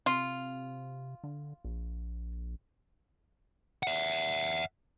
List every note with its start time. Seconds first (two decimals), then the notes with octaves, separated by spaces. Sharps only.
0.06 C3 F4
1.24 D3
1.65 A#1
3.83 E5 F#5